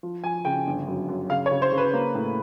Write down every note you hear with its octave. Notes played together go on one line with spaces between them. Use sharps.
F3
F3 G#5
C#3 G5
G1
F#2
F#2
C#3 F5
C#5
C#3
C5
C#3
B4
A#3
A2